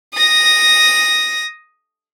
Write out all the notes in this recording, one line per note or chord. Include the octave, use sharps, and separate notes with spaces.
D#6 A#6